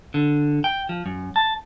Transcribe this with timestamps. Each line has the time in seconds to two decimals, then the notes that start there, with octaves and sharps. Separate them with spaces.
0.14 D3
0.64 G5
0.89 F3
1.06 F#2
1.36 A5